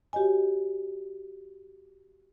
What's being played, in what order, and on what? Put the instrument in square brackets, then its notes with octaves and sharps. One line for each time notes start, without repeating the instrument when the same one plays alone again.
[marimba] F#4 G4 C#5 D#5 G#5